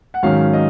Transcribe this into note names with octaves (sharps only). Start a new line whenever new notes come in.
F#5
G#2 D#3 F#3 C#4 F5
D#5